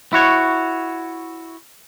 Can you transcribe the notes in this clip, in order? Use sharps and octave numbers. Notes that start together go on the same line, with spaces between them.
E4 F#4 C#5